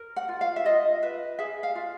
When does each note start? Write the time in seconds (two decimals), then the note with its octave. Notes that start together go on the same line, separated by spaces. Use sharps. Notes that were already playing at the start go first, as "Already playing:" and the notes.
Already playing: A#4
0.16 F#5
0.29 F4
0.41 F5
0.56 E5
0.65 F4 D#5
1.02 B4 E5
1.39 G#4 E5
1.63 F5
1.75 F4